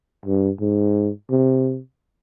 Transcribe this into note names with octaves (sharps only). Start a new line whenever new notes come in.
G2
G#2
C3